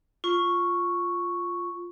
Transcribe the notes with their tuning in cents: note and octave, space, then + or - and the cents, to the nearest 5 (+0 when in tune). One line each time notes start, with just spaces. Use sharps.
F4 +0 C#6 +0